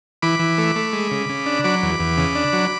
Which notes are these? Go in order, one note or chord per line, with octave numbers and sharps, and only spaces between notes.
E3 B5 D6
E3
A3
A3
G#3
C#3
C#3
D4
F#3 B5 D6
E2
E2
C#3
D4
F#3